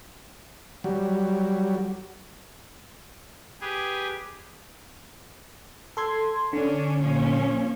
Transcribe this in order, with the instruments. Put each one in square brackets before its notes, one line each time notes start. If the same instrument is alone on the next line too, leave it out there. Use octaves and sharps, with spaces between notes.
[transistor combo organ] F#3 G3
[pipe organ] G4 G#4 B4
[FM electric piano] A4 C6 G#6
[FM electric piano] D3 [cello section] C#4 D4
[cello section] A#2 F3 C#4